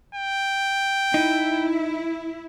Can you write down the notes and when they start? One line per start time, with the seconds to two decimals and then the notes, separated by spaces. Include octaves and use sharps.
0.15 G5
1.14 D#4 E4